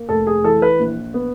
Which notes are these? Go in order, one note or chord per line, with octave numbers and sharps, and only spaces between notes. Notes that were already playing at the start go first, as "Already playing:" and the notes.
Already playing: A#3
F1 A4
G#4
E3 A4
B4
A#1
B3